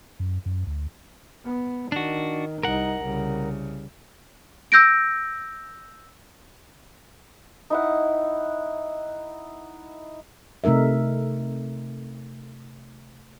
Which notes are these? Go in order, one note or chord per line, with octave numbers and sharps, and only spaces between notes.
F#2
F#2
D2
B3
D#3 D4 F#4
C2 D#4 A#4 F#5
C2 C#3
E6 G6 A#6 D7
D#4 E4 F#5
C3 A3 D#4 A#4 E5